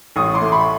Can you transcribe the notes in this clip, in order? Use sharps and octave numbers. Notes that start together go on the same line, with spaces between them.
A1 C#6 D#6
C6 D6
A3
B5 C#6